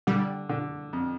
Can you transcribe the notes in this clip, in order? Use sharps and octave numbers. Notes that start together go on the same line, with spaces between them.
D3 G3
D3
F2